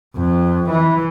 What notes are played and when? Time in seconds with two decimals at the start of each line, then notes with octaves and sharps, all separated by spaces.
0.16 F2
0.70 E3